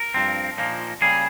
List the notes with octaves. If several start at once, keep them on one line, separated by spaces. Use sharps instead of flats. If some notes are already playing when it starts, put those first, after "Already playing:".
Already playing: A#4
G2 F3 C4
A#2 F3 A#3 D#4
C#3 G3 A#3 G#4